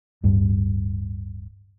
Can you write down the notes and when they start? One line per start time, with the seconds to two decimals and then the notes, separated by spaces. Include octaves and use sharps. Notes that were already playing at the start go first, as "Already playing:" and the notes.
0.23 D1 G2